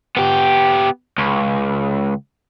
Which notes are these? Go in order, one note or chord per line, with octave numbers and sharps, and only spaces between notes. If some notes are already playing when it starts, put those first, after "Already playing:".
B3 G4
C#2